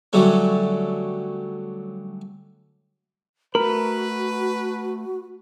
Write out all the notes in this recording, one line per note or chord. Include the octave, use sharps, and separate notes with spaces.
D3 F#3 G3 A3 C#4
A3 F#4 A#4 B4 B5